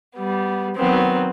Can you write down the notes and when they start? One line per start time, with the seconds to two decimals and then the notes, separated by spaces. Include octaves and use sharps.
0.15 G3 B3
0.75 D#3 F#3 B3 C4